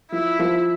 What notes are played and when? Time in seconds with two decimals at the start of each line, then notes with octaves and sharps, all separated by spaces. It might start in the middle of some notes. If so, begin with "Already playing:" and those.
0.12 F3 E4
0.39 F3